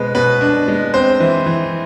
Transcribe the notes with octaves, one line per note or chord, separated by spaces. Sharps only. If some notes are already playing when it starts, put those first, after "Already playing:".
Already playing: B2 G#3 B3 B4 C5
B2 B4
D4
G#3
C4 C5
E3
E3